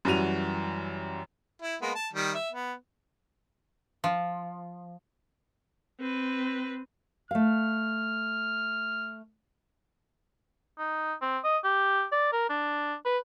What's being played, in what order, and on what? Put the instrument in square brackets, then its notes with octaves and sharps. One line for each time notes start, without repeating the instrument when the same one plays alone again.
[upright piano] F#2 E3 G3 F#4 D#7 F7
[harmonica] E4
G#3 A#3 B3
A5
D#3 G3
E5
B3
[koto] F3
[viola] C4 B4
[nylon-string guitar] A3 F5 [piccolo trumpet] F6
[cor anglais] D#4
C4
D#5
G4
D5
A#4
D4
B4